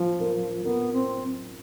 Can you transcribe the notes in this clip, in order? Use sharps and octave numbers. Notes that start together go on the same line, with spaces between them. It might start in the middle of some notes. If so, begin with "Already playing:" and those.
Already playing: F3 F4
A#4
B3 A#4
C4